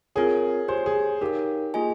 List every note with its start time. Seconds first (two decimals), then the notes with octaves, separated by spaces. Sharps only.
0.16 C4 F4 G#4 A#4 C#5
0.68 G4 C5 C#5 G#5
0.86 G#4
1.21 D#4 G4 A#4 C#5 F5
1.74 A#3 F4 G#4 D#5 G#5